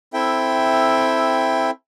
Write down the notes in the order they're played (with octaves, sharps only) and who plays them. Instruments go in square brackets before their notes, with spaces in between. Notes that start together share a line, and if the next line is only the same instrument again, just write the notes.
[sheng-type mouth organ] C4 E4 A4 E5 G5